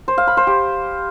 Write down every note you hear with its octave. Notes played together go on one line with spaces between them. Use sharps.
C5
F5
B5
C5
G4